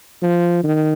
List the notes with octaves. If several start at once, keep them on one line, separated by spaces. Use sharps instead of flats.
F3
D#3